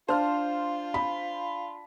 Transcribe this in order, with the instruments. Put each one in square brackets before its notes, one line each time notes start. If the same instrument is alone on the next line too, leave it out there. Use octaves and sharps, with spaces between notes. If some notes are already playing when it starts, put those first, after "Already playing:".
[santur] D4 F5 [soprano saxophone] F4 [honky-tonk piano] C5 F6
[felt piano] B5